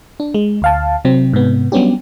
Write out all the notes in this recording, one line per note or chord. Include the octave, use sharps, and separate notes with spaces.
D4
G#3
D2 F5 A5
C3 F#3 C4
G#2 C3 B3
F#3 G3 B3 C#4 D4 G4